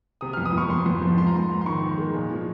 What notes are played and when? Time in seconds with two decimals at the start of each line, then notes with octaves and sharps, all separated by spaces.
0.21 C3 D#6
0.33 F6
0.37 F2
0.46 D#6
0.53 F2 C#6
0.70 F2 C6
0.86 F2
1.02 F3
1.18 G#2 C6
1.27 A#5
1.34 G#2 C6
1.50 G#2
1.61 C6
1.66 D#3 C#6
1.83 D#3
1.98 G#3
2.14 A#2
2.31 F3